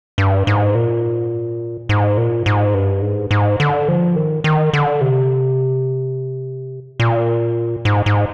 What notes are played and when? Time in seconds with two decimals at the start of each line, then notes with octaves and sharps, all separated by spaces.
0.18 G2
0.47 G#2
0.75 A#2
1.89 G#2
2.18 A#2
2.46 G#2
2.74 G2
3.02 G#2
3.31 G#2
3.60 D3
3.88 F3
4.16 D#3
4.44 D#3
4.73 D3
5.01 C3
7.00 A#2
7.85 G#2
8.06 G#2